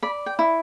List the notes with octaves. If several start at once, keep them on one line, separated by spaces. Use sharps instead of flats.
D5 B5
G5
E4